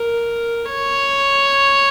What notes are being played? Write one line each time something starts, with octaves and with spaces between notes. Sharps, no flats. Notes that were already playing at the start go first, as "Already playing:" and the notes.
Already playing: A#4
C#5